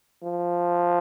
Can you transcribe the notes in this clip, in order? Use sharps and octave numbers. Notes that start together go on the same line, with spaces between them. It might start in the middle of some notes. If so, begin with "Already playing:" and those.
F3